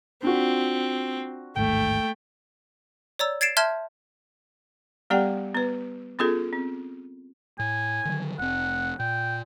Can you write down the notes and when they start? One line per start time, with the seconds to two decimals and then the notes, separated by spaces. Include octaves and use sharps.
0.23 C4 D4 F4 F#4
1.57 A1 D#2 G#2 A3 G5
3.19 C#5 D5 A#5 E6
3.41 G#6 A6 C7 D7 E7
3.57 E5 A5 C6 F6 G6 G#6
5.10 G3 B3 G4 D5 F#5 G5
5.55 B3 B4
6.19 B3 C#4 F4 G#4 A4
6.53 C4
7.59 A2 G#5
8.05 D3 D#3 F#3
8.39 F1 C4 F#5
8.99 A#2 G5